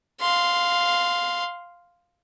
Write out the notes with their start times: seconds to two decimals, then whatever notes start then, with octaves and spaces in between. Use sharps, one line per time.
0.21 F5 C6